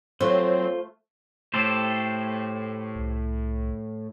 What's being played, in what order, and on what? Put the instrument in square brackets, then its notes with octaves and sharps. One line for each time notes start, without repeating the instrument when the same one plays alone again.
[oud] F#3 [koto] A3 [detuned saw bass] C4 [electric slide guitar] F4 C5
[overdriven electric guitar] A2 [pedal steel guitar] G4 A4 C5
[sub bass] C2